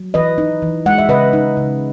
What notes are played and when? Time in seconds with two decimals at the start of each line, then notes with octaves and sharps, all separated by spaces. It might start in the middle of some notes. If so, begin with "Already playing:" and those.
Already playing: F#3
0.14 E3 B4 D#5
0.38 D#4
0.62 E3
0.86 G#3 F#5
0.98 E5
1.09 C#3 B4 D#5
1.33 D#4
1.57 C#3